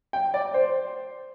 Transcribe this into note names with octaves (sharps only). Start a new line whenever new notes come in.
G5
D5
C5